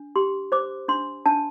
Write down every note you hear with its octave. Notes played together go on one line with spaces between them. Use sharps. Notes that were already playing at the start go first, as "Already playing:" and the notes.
Already playing: D4
G4 C6
C5 D6
D4 C6
D4 A5